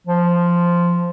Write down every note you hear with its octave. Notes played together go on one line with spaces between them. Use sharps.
F3